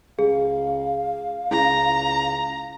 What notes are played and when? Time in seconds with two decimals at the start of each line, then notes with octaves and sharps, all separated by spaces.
0.19 C#2 G#4 F5
1.51 C#2 E4 G#4 A#5